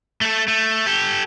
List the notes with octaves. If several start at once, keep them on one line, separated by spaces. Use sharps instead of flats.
A3 A4
A3
G4 A4